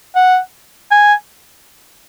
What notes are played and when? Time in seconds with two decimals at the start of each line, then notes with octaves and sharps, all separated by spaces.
0.15 F#5
0.91 G#5